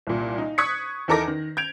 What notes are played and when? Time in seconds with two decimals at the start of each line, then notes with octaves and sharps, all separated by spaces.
0.07 C2 A#2
0.38 D#4
0.58 C#6 D#6 F#6 G#6 B6 C#7
1.08 E2 D#4 A4 A#4 D6 A#6
1.28 D#3
1.57 G6 G#6 D7 F7